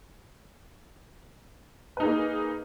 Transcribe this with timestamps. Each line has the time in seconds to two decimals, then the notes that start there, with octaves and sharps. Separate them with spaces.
1.97 B4
2.00 D#4
2.03 G#4
2.06 A#3